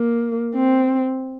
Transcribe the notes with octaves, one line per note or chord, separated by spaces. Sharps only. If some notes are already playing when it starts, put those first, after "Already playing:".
Already playing: A#3
C4